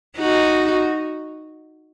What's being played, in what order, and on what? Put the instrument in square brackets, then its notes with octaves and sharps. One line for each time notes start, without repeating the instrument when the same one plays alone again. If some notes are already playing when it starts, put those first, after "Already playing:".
[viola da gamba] D#4 F#4